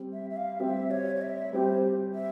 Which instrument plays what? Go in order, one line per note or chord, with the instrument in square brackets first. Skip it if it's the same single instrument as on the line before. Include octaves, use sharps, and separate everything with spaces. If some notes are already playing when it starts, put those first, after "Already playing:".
Already playing: [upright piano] G3 C4 G4
[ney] E5
E5
F5
[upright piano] G3 C4 G4 [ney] E5
[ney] C#5
C#5
E5
[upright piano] G3 C4 G4 [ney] C5
[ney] E5